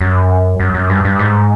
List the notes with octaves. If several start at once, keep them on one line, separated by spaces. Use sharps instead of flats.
F#2
F#2
F#2
G2
G2
G#2